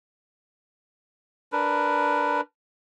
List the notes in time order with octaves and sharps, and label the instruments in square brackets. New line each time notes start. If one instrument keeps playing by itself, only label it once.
[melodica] D4 A#4 B4